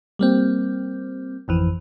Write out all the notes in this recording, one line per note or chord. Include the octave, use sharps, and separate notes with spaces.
G3 A#3 C4
G#1 F2 E3